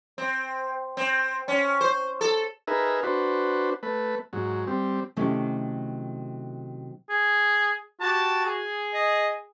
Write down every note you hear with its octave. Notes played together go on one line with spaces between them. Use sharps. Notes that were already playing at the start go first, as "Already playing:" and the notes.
C4
C4
C#4
C5
A4
D#4 G#4 A#4 B4 E5
D4 F#4 B4 C5
A3 B4
G#2 F#3
G3 C4
C3 D#3 F#3 A3 C#4 E4
G#4
F#4 G4 A5
G#4
D#5